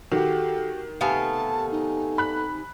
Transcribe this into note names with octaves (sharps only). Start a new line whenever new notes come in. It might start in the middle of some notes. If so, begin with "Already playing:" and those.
D#3 F#4 G4 A4
C3 A3 B3 F5 G#5 A5
D#4
B5 F#6